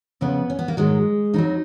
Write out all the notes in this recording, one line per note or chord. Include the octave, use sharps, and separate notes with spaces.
F2 C#3 F3 B3
C#4
B3
A#3
G#2 D#3 F#3 G#3
F2 D#3 F#3 D#4